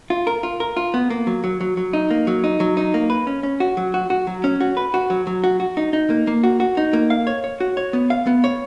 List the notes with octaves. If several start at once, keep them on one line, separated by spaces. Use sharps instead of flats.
F4
A#4
F4
A#4
F4
B3
A#3
F#3
F#3
F#3
F#3
D#4
A#3
F#3
D#4
F#3
D#4
A#3
B4
C#4
C#4
F#4
F#3
F#4
F#4
F#3
C#4
F#4
B4
F#4
F#3
F#3
F#4
F#4
D#4
D#4
A#3
A#3
F#4
F#4
D#4
A#3
F5
C#5
C#5
F#4
C#5
B3
F5
B3
C#5